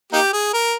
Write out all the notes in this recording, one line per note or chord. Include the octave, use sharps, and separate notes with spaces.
A#3 D#4 G4
G#4
A#4